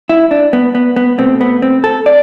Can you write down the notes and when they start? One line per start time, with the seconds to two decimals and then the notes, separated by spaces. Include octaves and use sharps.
0.09 E4
0.31 D4
0.53 B3
0.75 B3
0.96 B3
1.18 B2 A3 C4
1.41 B3
1.62 C4
1.84 A4
2.06 D5